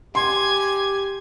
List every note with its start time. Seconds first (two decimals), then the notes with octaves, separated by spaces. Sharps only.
0.15 G4 G#5 C6 G#6